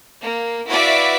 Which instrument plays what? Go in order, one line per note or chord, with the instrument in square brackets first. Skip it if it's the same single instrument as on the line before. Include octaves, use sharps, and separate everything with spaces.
[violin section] A#3
E4 F#4 B4 D5 E5 F5